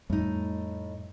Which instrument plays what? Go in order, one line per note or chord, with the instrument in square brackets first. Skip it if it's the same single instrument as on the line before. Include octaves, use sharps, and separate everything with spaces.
[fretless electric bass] F2 G3 [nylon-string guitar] A2 D#4